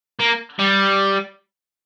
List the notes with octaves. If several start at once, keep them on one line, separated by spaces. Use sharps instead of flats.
A#3
G3